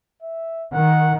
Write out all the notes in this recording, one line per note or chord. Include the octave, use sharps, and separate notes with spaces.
E5
D#3 F#5